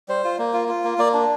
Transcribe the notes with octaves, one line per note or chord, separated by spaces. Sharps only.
G3 C5
F4
A#3
F4
F4
A#3
A#3 D5
D4